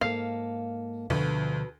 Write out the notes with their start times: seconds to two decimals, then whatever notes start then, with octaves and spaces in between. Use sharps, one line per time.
0.01 G#2 A#3 A4 F5
1.10 D2 B2 D3 F3 F#4 A4 B4